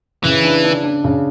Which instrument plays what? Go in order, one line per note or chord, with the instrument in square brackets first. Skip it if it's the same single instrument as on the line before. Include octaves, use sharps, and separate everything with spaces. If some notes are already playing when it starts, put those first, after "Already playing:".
[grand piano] C#3 [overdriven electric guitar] E3
[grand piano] D4
D4
D4
C#3